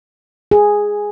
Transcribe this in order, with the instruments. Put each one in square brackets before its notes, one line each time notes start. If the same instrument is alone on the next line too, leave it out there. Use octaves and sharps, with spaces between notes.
[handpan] G#4